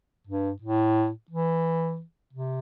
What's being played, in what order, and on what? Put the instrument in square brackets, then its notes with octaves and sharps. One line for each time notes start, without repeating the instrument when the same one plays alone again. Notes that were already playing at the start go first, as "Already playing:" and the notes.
[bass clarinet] G2
A2
E3
C3